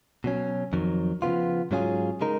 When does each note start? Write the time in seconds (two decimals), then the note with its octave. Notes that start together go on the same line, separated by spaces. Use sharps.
0.24 B2 F#3 C#4
0.73 F2 D#3 F#3
1.22 C#3 F3 B3 F4
1.71 G#2 F#3 C#4 F4 G#4
2.21 C#3 G#3 D#4 A#4